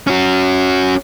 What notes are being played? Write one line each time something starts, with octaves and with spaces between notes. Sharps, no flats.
C#4 F#4